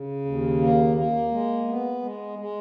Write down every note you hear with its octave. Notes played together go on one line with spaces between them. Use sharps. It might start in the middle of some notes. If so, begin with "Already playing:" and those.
Already playing: C#3
D#2
A#3
A#3
G#3
B3
G#3
G#3